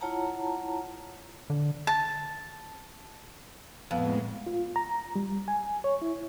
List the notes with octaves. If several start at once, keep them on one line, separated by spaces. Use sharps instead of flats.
E4 F4 C#5 F#5 A5 A#5
D3
A5
F2 A2 G#3 B3
F4
A#5
G3
G#5
C#5
E4